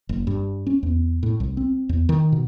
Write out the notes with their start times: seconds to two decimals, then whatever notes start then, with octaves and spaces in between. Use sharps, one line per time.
0.09 F#1
0.27 G2
0.67 C#4
0.83 E2
1.23 A2
1.40 C2
1.57 C4
1.89 E2
2.09 D#3
2.32 B2